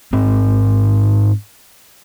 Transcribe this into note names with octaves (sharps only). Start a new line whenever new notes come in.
G#2 C4